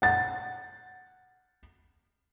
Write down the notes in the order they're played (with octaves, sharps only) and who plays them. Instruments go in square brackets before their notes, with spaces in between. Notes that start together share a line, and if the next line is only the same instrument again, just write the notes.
[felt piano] F#5 A6